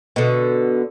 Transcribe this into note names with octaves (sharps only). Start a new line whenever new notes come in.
B2 D3